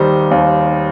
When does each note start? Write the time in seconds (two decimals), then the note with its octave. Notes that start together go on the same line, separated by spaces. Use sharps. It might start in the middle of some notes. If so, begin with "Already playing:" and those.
Already playing: D#2 D#3 G3 C5
0.31 D#2